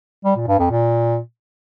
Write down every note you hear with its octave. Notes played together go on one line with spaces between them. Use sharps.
G3
A#2
G2
F2
A#2